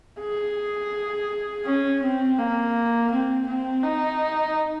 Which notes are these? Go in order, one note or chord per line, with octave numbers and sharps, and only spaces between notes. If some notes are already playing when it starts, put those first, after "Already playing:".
G#4
C#4
C4
A#3
C4
C4
D#4